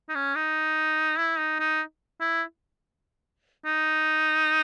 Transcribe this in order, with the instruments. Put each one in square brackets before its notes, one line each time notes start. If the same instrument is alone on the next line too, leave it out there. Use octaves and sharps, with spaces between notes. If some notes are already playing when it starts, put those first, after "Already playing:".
[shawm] D#4
C#4
D#4
E4
D#4
D#4
E4
D#4